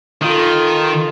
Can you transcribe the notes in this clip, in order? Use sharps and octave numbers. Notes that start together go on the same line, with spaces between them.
D#3 F4 A4